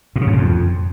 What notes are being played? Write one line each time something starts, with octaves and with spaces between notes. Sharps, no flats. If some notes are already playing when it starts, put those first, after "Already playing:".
A2
C#3
F2
E2
F2